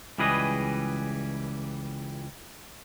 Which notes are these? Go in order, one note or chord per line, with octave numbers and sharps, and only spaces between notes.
C#2 E3 G3 G#4 B4 D#5